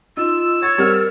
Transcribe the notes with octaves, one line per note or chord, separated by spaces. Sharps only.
D#4 F4 E6
C#5 A6
G3 C4 A#4 F6